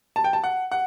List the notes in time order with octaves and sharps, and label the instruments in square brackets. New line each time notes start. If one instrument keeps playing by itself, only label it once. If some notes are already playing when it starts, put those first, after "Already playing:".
[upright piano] A5
G5
A5
F#5
F#5